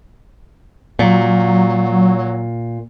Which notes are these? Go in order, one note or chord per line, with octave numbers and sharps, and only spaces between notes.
A#2 F#3